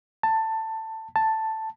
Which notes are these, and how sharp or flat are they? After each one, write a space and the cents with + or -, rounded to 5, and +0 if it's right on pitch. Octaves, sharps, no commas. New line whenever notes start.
A5 +15
A5 +5